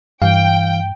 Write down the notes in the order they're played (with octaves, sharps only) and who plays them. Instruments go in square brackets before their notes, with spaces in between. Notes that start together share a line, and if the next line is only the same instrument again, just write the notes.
[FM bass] G2 [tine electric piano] E3 F5 [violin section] G5